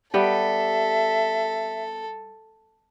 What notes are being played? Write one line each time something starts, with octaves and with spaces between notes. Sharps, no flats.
G3 B3 G4 A4 E5